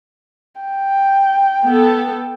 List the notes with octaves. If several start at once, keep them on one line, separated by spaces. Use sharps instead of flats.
G5
B3 A4